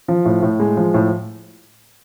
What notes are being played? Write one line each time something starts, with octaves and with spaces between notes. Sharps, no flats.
F3
A2
A2
G#3
F3
A2